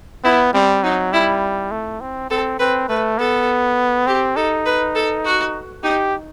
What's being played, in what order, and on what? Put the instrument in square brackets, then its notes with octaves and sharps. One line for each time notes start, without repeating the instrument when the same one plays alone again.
[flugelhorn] B3 [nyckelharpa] E4
[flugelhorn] G3 [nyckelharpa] C4
[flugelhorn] F#3 [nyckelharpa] D#4
[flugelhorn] G3 [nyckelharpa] E4
[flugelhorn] A3
C4
[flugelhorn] C4 [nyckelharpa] A4
[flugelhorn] C4 [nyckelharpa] B4
[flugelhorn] A3 [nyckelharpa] B4
[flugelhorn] B3 [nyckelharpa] A4
[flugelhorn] C4 [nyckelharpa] G4
[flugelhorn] D#4 [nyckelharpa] A4
[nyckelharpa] B4
A4
F#4
[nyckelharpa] D#4 [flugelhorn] G4